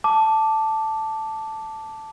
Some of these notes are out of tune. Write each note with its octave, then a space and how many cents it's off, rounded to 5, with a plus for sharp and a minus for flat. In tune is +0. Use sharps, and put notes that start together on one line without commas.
A5 +0 D6 +0